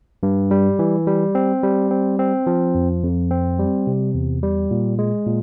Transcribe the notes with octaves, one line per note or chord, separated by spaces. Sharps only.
G2
G3
E3
G3
C4
G3
C4
C4
F3
F2
F2
C4
G3
C3
E2
G3
A#2
G#3
A#2